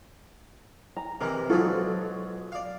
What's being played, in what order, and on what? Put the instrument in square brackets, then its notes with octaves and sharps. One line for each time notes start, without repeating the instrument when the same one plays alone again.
[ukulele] A#5
[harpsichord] C3 E3 [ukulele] A#4 D#5 A#5
[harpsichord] B1 G#2 F#3 [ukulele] F4 F#4 A4
[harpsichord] D5 F5